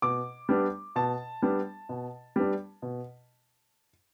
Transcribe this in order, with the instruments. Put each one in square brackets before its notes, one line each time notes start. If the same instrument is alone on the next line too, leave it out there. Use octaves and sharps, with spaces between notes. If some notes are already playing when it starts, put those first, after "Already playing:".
[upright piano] B2 D6
G3 B3 D4
B2 A5
G3 B3 D4
B2
G3 B3 D4
B2